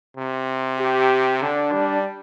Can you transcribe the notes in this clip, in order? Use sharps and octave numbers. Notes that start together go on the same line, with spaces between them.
C3
G4
D3 D4
G3